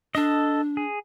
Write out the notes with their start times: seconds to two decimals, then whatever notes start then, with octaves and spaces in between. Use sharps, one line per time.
0.15 D4 A4 D#5
0.77 G#4